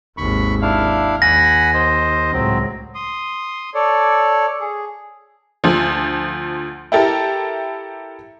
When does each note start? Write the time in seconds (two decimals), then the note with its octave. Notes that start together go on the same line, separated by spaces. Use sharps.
0.18 G#1 D#2 B5 C#6
0.62 D4 E4 F5
1.22 D#2 F#5 G#5 B5 A#6
1.74 C5 D#5
2.33 C#2 A2 F#3 C4
2.95 C6 D#6
3.74 A4 C#5 D5
4.61 G#4
5.64 D2 F3
6.92 E4 G4 A4 A#4